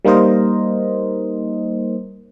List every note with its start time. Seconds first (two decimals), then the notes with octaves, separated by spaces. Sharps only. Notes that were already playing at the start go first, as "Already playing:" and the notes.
0.05 G3 A#3 D#4 A#4 C5 D#5